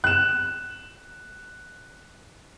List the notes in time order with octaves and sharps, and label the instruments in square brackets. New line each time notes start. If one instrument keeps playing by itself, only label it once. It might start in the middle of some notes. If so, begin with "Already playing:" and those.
[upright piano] F#6 E7